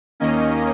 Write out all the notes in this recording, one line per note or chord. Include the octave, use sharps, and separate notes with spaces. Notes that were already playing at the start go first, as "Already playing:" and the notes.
D#2 D#3 A#3 C#4 D#5